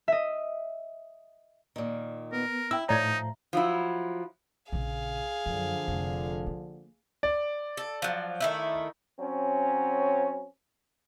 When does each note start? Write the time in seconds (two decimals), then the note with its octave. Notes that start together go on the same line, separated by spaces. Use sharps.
0.08 D#5 E5
1.76 A#2 D#3
2.33 B3 A#4
2.71 E4 G5 E6
2.89 A2 F3 D#4 C#5 D5 A#5 G#6
3.53 F3 F#3 E4
4.72 A#1 C#3 G#4 F5
5.46 F#2 D3 F3
5.88 F1
6.46 A#3
7.23 D5
7.77 A4
8.02 F3 F#3
8.40 D#3 A3 E4
9.19 F#3 C4 C#4